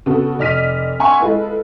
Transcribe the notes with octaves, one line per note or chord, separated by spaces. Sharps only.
C#3 B3 F#4 A4
F1 D5 D#5 F6 B6 D#7
E5 F#5 G#5 C6 C#6
G#3 E4 F4 A4 B4